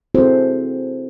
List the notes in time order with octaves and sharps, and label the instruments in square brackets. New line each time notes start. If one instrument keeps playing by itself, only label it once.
[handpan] C4 E4 F#4 G#4 A4 C5